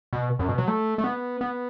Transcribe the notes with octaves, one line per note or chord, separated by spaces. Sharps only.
B2
F#2
B2
F#3
A3
A3
B3
B3